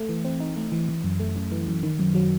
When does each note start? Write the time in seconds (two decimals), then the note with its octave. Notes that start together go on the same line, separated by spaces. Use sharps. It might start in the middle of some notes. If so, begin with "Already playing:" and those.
Already playing: A3
0.09 E3
0.25 C4
0.40 D#4
0.57 A3
0.72 E3
0.89 E3
1.04 F#2
1.19 A3
1.36 F#2
1.52 E3
1.67 F#2
1.83 D#3
1.99 F#2
2.15 F#3